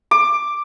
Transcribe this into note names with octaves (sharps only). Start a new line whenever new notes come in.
D6